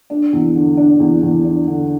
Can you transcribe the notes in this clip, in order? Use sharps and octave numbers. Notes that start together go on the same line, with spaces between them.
D4
E2
D3
D4
E2
E2
D4
D3